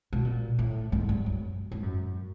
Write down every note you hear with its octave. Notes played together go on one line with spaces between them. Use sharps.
B2
A#2
A2
G#2
G2
F#2
G#2
F#2